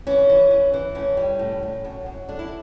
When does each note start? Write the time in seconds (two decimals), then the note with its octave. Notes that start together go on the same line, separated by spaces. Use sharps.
0.07 E3 C#4
0.29 E3
0.50 E3
0.74 E3
0.95 A2 C#4
1.17 G3
1.39 A2
1.63 A2
1.85 F#2
2.06 F#2
2.28 D3 D4
2.39 E4